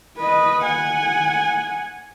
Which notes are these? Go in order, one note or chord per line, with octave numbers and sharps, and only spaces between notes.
B4 D#5
F#5 G#5